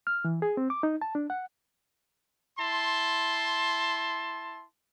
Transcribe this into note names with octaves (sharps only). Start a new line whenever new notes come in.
F6
E3
G#4
C4
D6
D#4
A5
D4
F#5
E4 A5 C6